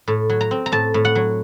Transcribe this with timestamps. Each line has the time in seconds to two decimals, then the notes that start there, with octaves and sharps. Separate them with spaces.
0.08 A2
0.29 F#3
0.41 A#5
0.51 C4
0.66 A#5
0.72 A2 A5
0.94 A2
1.05 F#5
1.15 F#3